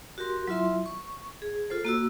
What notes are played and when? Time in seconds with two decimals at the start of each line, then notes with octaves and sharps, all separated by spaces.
0.18 F#4 G4 A#4 C6
0.48 F#3 E4 F4 E5 C6
0.86 C#6
1.42 G#4
1.70 F4 A4 C5
1.85 A#3 F#4 E6